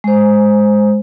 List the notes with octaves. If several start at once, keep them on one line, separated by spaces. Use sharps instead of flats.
G#3 C5